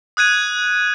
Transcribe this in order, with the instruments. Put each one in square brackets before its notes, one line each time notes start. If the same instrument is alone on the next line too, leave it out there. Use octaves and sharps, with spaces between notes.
[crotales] D#6 F#6 G#6 D#7